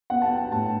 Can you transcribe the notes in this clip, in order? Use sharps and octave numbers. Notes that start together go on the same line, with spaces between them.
B3 F#5
A5
G5
A2 A5